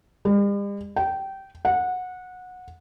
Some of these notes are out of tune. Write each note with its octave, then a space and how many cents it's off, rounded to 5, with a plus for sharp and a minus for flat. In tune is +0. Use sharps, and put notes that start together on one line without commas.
G3 +45
G5 -20
F#5 -20